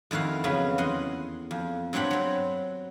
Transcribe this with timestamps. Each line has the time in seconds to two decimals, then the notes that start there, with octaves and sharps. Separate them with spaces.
0.11 F2 D#3 E4 F#4 F5
0.44 F2 C#3 F#3 B3 B5
0.78 E2 D#5 F#5 C6
1.51 F2
1.93 G2 F#3 C4 G4 F#5 B5
2.11 F#3 C4